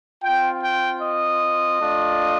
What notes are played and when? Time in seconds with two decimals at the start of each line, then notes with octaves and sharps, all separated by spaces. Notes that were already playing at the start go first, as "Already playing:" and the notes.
0.24 C4 F4 G5
0.63 G5
1.02 D#5
1.79 A3 D4 F4